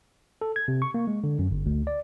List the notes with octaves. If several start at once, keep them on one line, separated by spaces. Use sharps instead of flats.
A4
G#6
C3
C#6
A#3
G#3
D3
F#2
G1
D2
D5